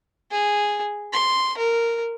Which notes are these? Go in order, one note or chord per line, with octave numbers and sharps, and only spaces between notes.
G#4
C6
A#4